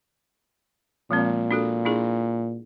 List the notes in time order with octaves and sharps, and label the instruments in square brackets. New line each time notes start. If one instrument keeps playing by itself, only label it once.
[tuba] A#2 [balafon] F3 G#3 C4
[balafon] D4 F#4 A4
D4 E4 G#4